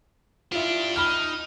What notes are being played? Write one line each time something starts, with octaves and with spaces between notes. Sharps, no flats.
D4 E4 F4 G4
D#4 B5 F6